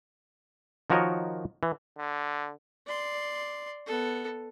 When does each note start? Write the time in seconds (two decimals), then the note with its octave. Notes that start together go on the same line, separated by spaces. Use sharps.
0.90 D#3 F3 F#4 A#4 C#5 D#5
1.63 E3
1.98 D3
2.87 D5 C6
3.87 B3 A4